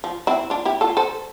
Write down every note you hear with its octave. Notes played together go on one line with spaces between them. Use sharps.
F3
C4 E4
D4 F4
E4 G4
F4 A4
A4 C5